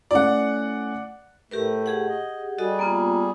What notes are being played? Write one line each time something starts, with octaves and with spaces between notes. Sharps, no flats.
A3 C#4 E4 D5 F#5
A2 A3 G4 A#4 B4
G4 G#4 F#5
D#5
G3 F#4 G#4 A4 D#5
A#3 B3 F4